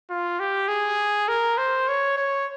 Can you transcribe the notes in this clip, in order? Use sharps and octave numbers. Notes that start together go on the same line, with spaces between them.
F4
G4
G#4
A#4
C5
C#5
C#5